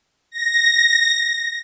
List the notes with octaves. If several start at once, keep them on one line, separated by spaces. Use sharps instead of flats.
A#6